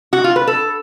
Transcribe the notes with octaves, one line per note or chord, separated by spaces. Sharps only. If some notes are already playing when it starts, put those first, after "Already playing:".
F#4
F4
B4
A4